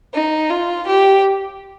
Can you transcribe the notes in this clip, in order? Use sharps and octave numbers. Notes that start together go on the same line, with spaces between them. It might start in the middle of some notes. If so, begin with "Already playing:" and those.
D#4
F4
G4